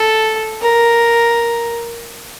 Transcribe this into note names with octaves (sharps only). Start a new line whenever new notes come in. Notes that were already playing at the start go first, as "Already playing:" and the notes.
Already playing: A4
A#4